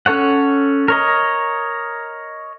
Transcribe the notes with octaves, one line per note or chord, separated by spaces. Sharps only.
C#4 A4 C#5 F#5
A#4 C#5 D#5